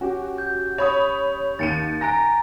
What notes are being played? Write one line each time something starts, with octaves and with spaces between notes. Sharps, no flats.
C#4 F#4 G4
G6
C#5 B5 D#6
D#2 A6 C#7 D#7
G#5 A#5 F#6 A#6 D7